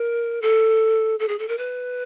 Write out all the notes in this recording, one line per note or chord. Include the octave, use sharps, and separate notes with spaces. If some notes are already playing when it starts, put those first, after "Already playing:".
Already playing: A#4
A4
A4
G#4
A4
A#4
B4